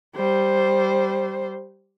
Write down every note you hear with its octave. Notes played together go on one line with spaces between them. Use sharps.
G3 C5